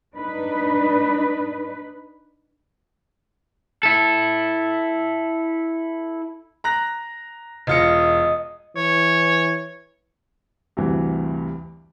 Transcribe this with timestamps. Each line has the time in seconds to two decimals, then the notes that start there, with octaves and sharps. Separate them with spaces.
0.15 D4 D#4 B4
3.83 E4 A4
6.64 A#5 F#6 A#6
7.67 E1 F4 D#5 C#7
8.76 E3 C#5
10.77 D2 G2 C3 E3